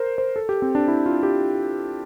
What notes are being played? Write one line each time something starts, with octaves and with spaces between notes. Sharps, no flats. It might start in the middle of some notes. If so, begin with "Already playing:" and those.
Already playing: A#4 C5
C5
A4
G4
C4
D4
E4
F4
G4